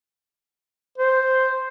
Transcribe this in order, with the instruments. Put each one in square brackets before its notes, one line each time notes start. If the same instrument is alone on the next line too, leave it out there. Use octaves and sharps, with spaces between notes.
[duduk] C5